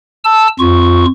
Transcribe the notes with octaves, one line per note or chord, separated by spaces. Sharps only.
A5 E6
F2 F4 C#6